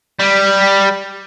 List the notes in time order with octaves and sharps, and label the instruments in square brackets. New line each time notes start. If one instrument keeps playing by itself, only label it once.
[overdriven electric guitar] G3